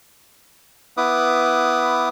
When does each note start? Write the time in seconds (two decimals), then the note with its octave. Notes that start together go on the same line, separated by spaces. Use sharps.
0.97 B3 E4 B4 D6 D#6